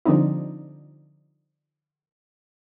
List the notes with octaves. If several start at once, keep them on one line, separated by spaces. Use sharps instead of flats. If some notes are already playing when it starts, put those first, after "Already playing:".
D3 F3 G3 C4 D4 D#4